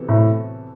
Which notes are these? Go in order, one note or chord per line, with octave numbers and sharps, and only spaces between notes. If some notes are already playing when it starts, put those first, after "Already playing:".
Already playing: C3 E3 B3 F#4 A4
A2